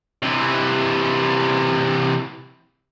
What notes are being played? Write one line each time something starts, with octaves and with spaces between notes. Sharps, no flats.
C3 E3